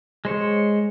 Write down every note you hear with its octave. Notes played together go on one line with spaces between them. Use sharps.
G#3 C5 C#5